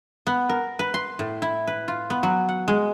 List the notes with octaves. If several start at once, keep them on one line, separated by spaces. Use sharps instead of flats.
B3
A#4
B4
C6
A2
E4
B4
F4
B3
F#3
F#5
G#3